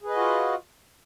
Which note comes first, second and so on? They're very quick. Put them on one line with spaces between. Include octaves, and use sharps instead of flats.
G#4 B4 D#5 F#4 F4